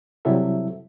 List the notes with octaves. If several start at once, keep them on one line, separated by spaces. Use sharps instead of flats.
C3 F#3 G3 E4 A4 E5